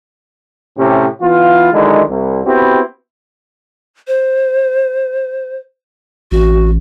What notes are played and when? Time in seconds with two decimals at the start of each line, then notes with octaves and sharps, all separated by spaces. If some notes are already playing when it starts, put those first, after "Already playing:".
0.78 A2 C3 C#4 G4
1.21 E3 B3 E4 F4
1.73 D3 D#3 F#3 G#3 D#4 E4
2.08 C2
2.45 B3 C4 E4 F#4 G4
4.07 C5
6.32 A1 F#4